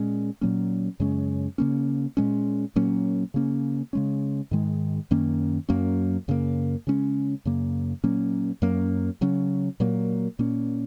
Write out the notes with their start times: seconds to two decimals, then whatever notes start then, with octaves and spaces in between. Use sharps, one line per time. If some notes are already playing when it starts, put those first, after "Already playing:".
Already playing: A#2 G#3 C#4
0.41 A#2 F#3 A#3 C#4
1.00 F#2 C#3 G#3 C#4
1.58 C#3 A#3 C#4
2.17 A#2 G#3 C#4
2.76 A#2 F#3 A#3 C#4
3.34 C#3 A#3 C#4
3.93 C#3 G#3 C#4
4.51 G#2 D#3 G#3
5.11 F#2 D#3 A#3 C#4
5.69 F#2 F#3 A#3 C#4
6.28 F#2 C#3 A#3
6.87 C#3 G#3 C#4
7.45 F#2 C#3 A#3
8.04 A#2 F#3 A#3 C#4
8.62 F#2 F#3 A#3 C#4
9.21 C#3 F#3 C#4
9.80 A#2 F#3 A#3
10.39 A#2 A#3 C#4